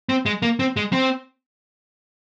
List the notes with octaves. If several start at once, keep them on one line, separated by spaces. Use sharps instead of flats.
C4
G#3
A#3
C4
G#3
C4